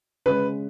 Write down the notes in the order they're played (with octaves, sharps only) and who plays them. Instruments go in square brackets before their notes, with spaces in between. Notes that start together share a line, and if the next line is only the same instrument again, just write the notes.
[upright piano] C#3 G#3 C#4 [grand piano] B4